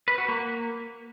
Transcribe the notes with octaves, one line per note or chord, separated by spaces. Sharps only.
B4
F#4
A#3